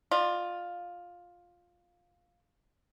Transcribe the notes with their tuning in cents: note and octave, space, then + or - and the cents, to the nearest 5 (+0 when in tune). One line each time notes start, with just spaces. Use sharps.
F4 +10 D5 +45